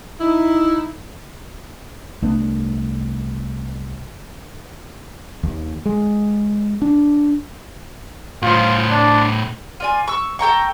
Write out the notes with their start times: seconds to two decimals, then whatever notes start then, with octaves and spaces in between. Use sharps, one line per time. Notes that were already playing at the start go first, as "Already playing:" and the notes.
0.21 D#4 E4
2.22 C2 A3 B3 D4
5.43 D#2
5.86 G#3
6.82 D4
8.42 A2 F4 C5
8.90 D4
9.80 F4 D5 G#5
10.08 C#6 E6
10.39 A4 G5 A#5 C#6